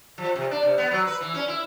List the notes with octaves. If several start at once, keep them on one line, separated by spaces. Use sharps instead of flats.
F3
C3
D4
C3
B3
F#3
B4
E3
C#4
E4